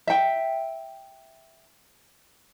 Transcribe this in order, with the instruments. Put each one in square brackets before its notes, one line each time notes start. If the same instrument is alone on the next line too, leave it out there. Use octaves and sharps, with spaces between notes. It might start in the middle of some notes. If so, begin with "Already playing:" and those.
[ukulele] E5 G5